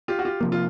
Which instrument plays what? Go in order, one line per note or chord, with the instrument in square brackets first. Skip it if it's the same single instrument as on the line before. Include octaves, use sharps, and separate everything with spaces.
[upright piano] F4 G4
F#4
F4 G4
[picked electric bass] C3 F3 A#3
[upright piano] F4